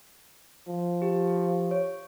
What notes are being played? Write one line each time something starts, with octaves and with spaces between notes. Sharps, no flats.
F3
G4
C#5